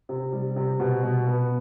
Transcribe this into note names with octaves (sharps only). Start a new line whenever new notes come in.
C3
G3
C3
B2
B2
B3